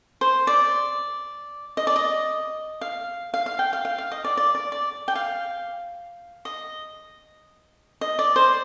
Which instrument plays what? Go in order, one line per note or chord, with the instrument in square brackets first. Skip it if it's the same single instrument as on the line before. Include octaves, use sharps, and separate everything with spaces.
[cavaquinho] C5
D5
D#5
D5
D#5
F5
F5
F5
G5
F5
F5
F5
D#5
D5
D5
D5
D5
G5
F5
D#5
D#5
D5
C5